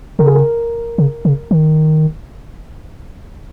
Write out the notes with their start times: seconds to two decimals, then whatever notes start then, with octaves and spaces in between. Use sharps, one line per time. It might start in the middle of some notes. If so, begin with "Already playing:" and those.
0.19 C#3 A#4
0.26 G#4
0.34 A#4
0.98 C#3
1.25 C#3
1.51 D#3